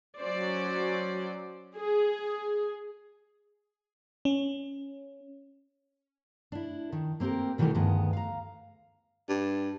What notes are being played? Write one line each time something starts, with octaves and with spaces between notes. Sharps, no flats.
F#3 C#4 C5 D5
G#4
C#4
D4 E4
D#3
A#3 C4 F#4 G4 A#4
B2 D#3 E3 G3 A3 A#4
D2 G2 D#3 G#3 B3
F5 A#5
G2